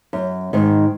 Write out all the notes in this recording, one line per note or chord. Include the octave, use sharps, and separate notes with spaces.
F#2
G#2 D#3